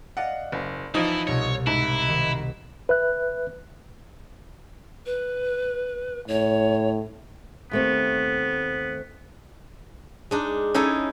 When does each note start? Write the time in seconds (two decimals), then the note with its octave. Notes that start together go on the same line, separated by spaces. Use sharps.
0.17 D5 D#5 F5 F#5
0.52 F#1
0.95 E3 F3 D#4 E4
1.27 C2 B2 C#5
1.67 G#2 E4
2.08 D#3 F#4
2.89 B4 E5 F#6
5.06 B4
6.28 A2 C#5
7.71 D#2 A3 B3 C4
10.31 G#3 D4 D#4
10.74 C#4 D#4 E4 G#4 A4